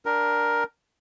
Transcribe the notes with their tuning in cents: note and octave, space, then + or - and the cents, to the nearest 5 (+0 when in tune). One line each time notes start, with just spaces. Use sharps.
D4 +0 A#4 +10 G5 -30